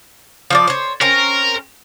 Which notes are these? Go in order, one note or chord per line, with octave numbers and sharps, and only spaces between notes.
F3 C#5 D5
C5 C#5
C4 C#4 A#4